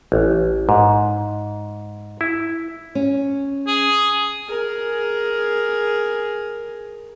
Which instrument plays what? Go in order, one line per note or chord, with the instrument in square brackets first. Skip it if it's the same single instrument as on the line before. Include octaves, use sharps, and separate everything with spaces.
[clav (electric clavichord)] A1
G#2
E4
[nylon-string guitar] C#4
[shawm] G#4
[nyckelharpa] G#4 A#4